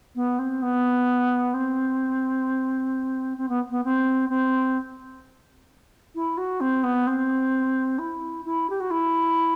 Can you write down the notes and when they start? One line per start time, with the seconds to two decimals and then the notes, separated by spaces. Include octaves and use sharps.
0.15 B3
0.38 C4
0.62 B3
1.53 C4
3.37 C4
3.48 B3
3.69 B3
3.84 C4
4.29 C4
6.15 E4
6.37 F#4
6.60 C4
6.83 B3
7.06 C4
7.98 E4
8.45 E4
8.69 G4
8.80 F#4
8.90 E4